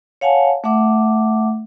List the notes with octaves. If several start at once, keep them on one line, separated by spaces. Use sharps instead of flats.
C#5 F5 F#5 G#5 A5
A3 E5 F#5 D6